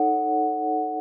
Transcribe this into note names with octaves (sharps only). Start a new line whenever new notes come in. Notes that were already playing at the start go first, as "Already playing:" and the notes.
Already playing: D#4 A4 C#5 F#5